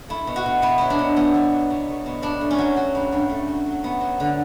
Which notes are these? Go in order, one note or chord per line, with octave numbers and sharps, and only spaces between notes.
A3 E4
B2
F#4
B2
B2 E4
F#3 E4
D4
B2
B2 B3
B2
F#3
B2
A3
B2
G2 D4
A3
C#4
F#3
F#3
G2
G2
A3
F#3
F#3
A3 B3
F#3
D3